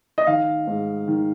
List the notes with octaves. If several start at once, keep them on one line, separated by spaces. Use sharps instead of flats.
D#5
D#3 F5
G#2
D#3